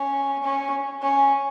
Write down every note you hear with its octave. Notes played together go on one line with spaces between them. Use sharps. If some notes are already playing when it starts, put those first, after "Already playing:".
Already playing: C#4
C#4
C#4